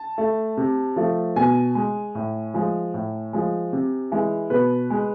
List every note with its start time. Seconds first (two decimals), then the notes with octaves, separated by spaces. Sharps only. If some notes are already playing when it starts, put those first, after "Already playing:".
Already playing: A5
0.18 A3
0.57 C3
0.96 F3 A3
1.36 B2 G#5
1.75 G#3
2.15 A2
2.54 F3 G#3
2.94 A2
3.33 F3 G#3
3.73 C3
4.12 E3 G#3
4.50 B2 B4
4.90 G#3